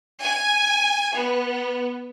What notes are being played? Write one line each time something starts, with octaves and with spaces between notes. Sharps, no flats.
G#5
B3